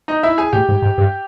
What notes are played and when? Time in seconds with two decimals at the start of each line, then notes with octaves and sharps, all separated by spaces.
0.08 D#4 D#5
0.23 E4 E5
0.38 G#4 G#5
0.53 A2 G4 G5
0.69 G#2
0.82 G#2
0.98 G2